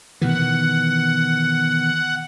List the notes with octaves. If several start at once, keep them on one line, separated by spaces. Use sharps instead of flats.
B2 D#3 E3 F#5